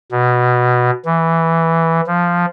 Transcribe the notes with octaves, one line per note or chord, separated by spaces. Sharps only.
B2
E3
F3